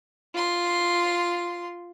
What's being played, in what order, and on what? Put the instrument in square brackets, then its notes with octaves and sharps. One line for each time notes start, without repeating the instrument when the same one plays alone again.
[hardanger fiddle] F4 C6